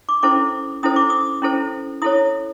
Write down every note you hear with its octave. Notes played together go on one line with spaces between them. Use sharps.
D6
C#4 E4 A4 C5 D6
C#4 E4 A4 C5 D#6
D6
D#6
C#4 E4 A4 C5
E4 A4 C#5 D#6